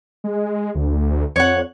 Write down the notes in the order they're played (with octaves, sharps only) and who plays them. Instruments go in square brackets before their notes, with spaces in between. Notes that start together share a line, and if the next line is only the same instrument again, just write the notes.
[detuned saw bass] G#3
D2
[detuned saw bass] F2 [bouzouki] C#5 F#5